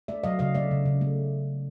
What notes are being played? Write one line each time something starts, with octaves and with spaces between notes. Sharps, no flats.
A3 D5 E5
F#3 D#5 F5
C#3 D#5 F5
A3 D5 E5
C#3
C#3
A3